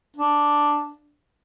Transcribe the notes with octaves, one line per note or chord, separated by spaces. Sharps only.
D4